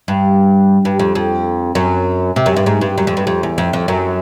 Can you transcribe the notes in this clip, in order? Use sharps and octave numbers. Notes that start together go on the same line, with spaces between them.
G2
G2
F2
F2
F#2
C3
F#2
G2
G#2
G2
F#2
F2
G2
F2
E2
F2
F2
F#2